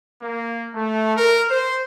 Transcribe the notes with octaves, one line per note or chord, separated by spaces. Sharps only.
A#3
A3
A#4
C5